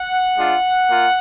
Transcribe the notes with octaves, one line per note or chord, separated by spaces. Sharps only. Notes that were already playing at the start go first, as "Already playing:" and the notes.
Already playing: F#5
G#3 D4 F4
A#3 F4